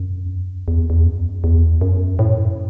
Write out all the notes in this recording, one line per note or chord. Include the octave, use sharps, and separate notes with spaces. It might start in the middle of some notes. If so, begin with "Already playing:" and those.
Already playing: F#2
E2
F#2
E2
E2
F#2
E2
F#2
A2
F#2